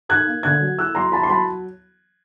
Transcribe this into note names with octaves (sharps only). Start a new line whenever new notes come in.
D#4 F#6 G#6
A#3
D3 F#6 G#6
F#3
E4 E6 F#6
F#3 A#5 C6
E4 A5 B5
C6
F#3 A5 B5